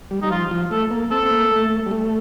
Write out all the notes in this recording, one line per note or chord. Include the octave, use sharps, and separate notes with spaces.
G3
G3 D#4
F3 F4
F3
A3 A4
A#3
C4 A4
C4
A#3
A3
G3
A3